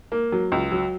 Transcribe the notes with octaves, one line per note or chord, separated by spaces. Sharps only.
A#3
F#3
C#2
F#3